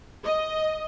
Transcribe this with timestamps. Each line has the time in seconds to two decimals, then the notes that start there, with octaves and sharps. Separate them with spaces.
0.24 D#5